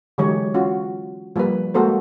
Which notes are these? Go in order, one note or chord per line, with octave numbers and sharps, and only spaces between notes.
D3 E3 F#3 G#3 G4 C#5
C#4 F4 F#4
F3 G3 A#3 A#4 B4
G#3 A#3 F#4 A4 A#4 C5